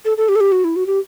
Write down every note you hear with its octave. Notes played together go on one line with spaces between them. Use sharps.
A4
A4
G4
A4
G4
F#4
E4
F#4
G4